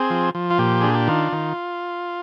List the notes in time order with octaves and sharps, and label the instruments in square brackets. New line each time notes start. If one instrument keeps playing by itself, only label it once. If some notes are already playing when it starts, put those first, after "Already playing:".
Already playing: [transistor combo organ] C4 G#4
F3
F3
F4
A#2 G4
D4 G#4
G4
D#3 F4
D#3